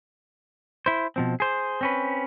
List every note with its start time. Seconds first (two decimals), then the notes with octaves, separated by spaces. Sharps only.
0.86 E4 C5
1.16 B2 F3 C4
1.40 G#4 C5
1.81 C4 C#4 B4